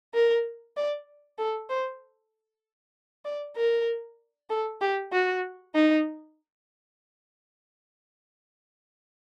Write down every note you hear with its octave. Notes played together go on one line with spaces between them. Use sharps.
A#4
D5
A4
C5
D5
A#4
A4
G4
F#4
D#4